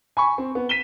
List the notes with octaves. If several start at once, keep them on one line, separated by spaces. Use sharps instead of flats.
G#5 B5 C#6
C4
B3
B6 D#7 E7 G7